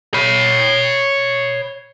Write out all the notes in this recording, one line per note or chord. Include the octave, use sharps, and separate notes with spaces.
C#5 B5